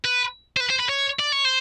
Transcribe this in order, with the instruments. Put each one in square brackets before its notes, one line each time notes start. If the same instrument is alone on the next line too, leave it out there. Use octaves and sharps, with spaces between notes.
[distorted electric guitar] B4
C5
B4
C5
B4
C#5
D5
C#5
C5